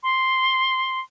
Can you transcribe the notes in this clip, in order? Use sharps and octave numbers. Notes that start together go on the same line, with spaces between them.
C6